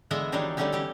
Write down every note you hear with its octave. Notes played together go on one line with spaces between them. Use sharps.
D3 E3 G#3 B3 D#5 E5
D#3 E3 F#3 G3 D4 D#4
D3 F#3 G3 A3 C#4 D#4
E3 C#4 G4